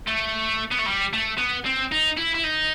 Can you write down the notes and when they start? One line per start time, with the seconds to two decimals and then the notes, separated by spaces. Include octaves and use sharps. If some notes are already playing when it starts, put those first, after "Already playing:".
0.08 A3
0.71 B3
0.79 A3
0.87 G3
1.13 A3
1.38 B3
1.66 C4
1.92 D#4
2.17 E4
2.35 E4
2.44 D#4